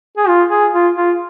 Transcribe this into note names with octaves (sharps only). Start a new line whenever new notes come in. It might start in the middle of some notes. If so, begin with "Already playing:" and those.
G#4
F4
G#4
F4
F4